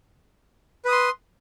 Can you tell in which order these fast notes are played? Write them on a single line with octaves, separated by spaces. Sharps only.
B4 D#6 C6